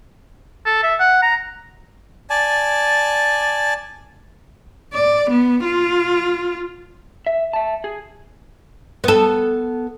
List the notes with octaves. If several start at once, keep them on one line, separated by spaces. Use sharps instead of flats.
A4
E5
F#5
A#5
D5 G#5 A5
D5
B3
F4
E5
E5 A5
G#4
B3 A4